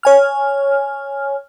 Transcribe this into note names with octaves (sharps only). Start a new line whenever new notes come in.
C#5 G#5 F6